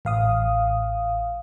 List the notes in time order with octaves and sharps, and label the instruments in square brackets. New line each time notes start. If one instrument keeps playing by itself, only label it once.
[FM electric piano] A1 F5 D#6